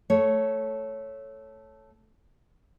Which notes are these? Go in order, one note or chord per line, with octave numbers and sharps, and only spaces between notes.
A3 C#5